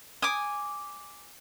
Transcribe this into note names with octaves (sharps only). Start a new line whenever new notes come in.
G#5 D6 D#6